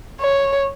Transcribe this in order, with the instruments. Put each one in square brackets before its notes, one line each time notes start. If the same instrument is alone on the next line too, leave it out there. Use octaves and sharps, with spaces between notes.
[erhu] C#5